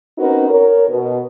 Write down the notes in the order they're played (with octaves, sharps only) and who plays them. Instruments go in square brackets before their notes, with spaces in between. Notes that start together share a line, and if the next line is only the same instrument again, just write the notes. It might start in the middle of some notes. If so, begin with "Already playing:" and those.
[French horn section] C4 C#4 D#4 F#4 A#4 B4
A#4 C#5
B2